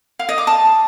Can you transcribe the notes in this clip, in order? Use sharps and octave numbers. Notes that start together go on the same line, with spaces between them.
F5
D#5
D6
A5